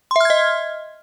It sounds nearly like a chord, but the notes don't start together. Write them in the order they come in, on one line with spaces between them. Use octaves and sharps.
C6 E5 F6 G#6 D#5